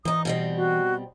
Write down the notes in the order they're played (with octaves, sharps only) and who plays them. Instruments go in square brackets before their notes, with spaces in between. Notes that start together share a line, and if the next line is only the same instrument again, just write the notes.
[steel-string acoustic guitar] G#2 D#4 [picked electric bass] E3 [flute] D#6
[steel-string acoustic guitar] B2 G3 C4 [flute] D#5
[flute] F#4